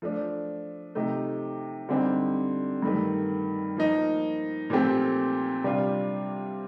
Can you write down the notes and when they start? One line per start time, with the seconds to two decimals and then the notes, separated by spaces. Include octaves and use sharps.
0.02 F3 A3 D4
0.95 C3 F3 A3 D#4
1.89 D3 G3 C4 D#4 G4
2.82 G2 D#3 A3
3.77 F3 A#3 D#4
4.70 A#2 F3 A3 C4 G4
5.64 C3 G3 D4 F4